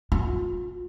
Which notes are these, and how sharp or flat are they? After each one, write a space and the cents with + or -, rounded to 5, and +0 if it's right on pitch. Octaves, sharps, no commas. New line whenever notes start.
F4 +35